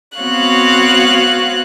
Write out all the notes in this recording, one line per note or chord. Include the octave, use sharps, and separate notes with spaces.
B3 C4 F#4 C#5 F5 F#6